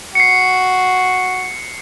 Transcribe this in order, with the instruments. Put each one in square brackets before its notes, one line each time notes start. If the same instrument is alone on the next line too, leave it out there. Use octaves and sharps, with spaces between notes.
[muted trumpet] F#4 [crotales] C7 C#7